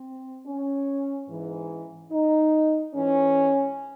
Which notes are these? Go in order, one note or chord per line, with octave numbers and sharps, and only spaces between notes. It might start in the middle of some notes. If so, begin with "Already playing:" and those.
Already playing: C4
C#4
G#2 E3
D#4
G#2 E3 C#4